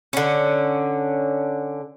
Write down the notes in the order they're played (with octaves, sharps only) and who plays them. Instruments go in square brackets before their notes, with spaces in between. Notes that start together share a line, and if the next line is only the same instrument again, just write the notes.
[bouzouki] D3 C#4